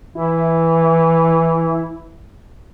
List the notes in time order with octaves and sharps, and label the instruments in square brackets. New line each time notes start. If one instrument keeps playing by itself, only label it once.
[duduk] E3 [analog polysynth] E4